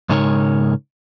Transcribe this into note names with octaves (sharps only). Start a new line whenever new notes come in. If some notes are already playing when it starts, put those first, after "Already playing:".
G#2 C#3 G#3 D#4 A#4 C#5